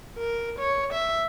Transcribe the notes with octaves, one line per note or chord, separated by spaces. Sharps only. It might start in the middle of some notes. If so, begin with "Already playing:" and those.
A#4
C#5
E5